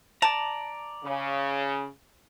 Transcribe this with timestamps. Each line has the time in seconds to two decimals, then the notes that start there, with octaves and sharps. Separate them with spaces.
0.22 D5 A5 A#5
1.04 C#3